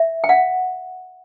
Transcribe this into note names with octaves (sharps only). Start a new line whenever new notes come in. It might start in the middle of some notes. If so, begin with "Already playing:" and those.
Already playing: E5
G5
F#5